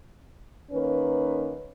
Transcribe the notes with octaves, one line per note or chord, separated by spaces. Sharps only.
D#3 A#3 C#4 B4